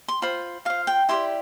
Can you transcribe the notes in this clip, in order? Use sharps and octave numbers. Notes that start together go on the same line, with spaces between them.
C6
F4 C5 B5
F4 C5 F5
G5
E4 G4 D5 C6